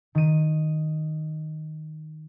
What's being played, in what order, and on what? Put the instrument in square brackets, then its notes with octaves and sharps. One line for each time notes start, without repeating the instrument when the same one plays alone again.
[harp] D#3 D#7